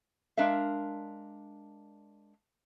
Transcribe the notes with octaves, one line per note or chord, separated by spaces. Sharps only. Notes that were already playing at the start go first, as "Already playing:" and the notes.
G#3 D4 A#4 E5 F5